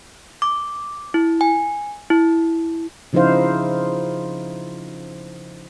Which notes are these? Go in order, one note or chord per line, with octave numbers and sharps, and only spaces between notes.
D6
E4
G#5
E4
C#3 F3 D#4 E4 C5 F5